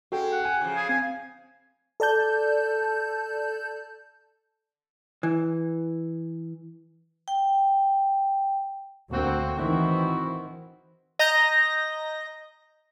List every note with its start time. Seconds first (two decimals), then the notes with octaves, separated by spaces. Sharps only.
0.12 G#3 C#4 F#4 A4 G5
0.32 F#5
0.45 G#5
0.61 C#3 F3
0.76 G#4
0.89 C4 G#5
2.00 A4 D5 A5 G6
5.23 E3
7.28 G5
9.12 D2 A#3 C4 F#4
9.58 D#3 E3 C4 E4 F#4
11.19 D#5 A#5 G6 A#6